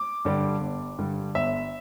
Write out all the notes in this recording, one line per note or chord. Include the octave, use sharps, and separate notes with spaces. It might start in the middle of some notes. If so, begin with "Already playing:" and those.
Already playing: D6
G2 D3 G3
G1
G2 D3 G3
G1 E5